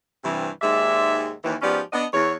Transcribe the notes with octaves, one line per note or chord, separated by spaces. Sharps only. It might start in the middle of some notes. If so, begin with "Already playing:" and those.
G2 C3 E3
D#2 G#2 G#3 D5 E5
D#2 E3
G#2 F3 B3 C#4 G4 D5
B3 D4 D#5
E2 C#5